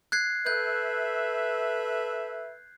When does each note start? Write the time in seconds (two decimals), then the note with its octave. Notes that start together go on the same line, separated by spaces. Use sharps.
0.12 F#6 G#6 C7
0.46 A4 B4 E5 F#6 G6